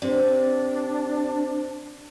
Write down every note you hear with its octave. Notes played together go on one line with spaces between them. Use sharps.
C3 D4 C5 D5